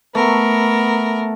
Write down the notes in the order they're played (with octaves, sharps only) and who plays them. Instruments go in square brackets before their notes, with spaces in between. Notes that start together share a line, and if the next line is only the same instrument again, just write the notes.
[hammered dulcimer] A3 [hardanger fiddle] B3 A#4